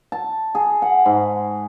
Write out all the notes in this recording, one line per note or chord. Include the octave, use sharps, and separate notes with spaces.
A5
G#4
F#5
G#2